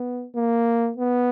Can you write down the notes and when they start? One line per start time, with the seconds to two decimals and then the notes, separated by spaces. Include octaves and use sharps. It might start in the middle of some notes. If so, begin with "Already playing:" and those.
Already playing: B3
0.36 A#3
0.97 B3